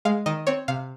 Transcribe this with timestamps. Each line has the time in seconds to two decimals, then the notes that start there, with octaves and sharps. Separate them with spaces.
0.05 G#3 F5
0.26 D#3 D#5
0.47 C4 C#5
0.68 C3 F5